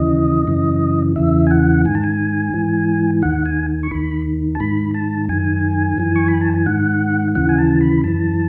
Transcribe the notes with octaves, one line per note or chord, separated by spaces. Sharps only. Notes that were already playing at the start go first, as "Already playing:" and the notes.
Already playing: D#2 C#3 E3 D#5
F#2 C#3 E3
E2 C#3 E3 E5
G#5
F#5
G#2 D#3 G#5
A5
G#5
G#2 E3
D#2 D#3 F#5
G#5
C#6
D#2 D#3 B5
A5
G#2 D#3 B5
A5
F#2 D#3 G#5
F#2 E3
C#6
B5
A5
G#5
G#2 D#3 F#5
D#2 C#3 E3 F#5
G#5
A5
B5
F#2 E3 A5